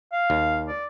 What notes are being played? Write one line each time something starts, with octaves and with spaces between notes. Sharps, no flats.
F5
D#2
D5